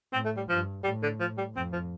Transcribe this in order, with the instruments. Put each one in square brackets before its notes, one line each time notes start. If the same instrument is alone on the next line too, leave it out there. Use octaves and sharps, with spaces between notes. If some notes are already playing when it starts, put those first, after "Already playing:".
[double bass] A2 [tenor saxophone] C4
[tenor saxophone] A3
G3
[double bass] G2 [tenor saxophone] F3
[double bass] A2 [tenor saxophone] G3
[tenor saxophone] D3
F3
G3
[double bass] F2 [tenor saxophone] C4
[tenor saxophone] F3